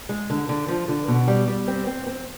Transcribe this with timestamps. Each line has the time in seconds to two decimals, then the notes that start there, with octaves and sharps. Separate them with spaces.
0.09 G#3
0.30 D3
0.49 D3
0.68 F3
0.88 D3
1.08 B2
1.28 G3
1.47 G3
1.68 C4
1.87 C4
2.07 C4